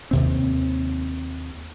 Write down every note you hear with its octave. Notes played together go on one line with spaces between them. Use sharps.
D#2 C3 C4